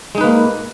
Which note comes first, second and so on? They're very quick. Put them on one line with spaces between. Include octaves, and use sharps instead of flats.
G#3 D#4 B4 A#3